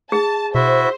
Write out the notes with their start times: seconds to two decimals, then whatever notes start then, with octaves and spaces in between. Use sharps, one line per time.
0.12 G#4 A5
0.55 B2 E4 F#4 C5 E5